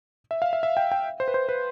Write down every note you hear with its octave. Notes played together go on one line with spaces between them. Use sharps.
E5
F5
E5
E5
G5
G5
C5
B4
C5
B4